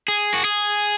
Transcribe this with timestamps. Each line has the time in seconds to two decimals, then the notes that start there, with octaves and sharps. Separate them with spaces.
0.08 G#4
0.34 F#4
0.44 G#4